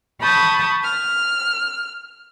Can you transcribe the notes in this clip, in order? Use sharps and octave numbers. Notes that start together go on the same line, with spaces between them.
A5 B5 C#6 D#6 G6
F6